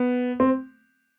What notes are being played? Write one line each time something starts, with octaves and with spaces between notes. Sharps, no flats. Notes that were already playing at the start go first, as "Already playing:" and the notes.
Already playing: B3
C4